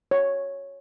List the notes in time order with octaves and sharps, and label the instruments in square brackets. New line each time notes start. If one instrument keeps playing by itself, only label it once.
[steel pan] C#5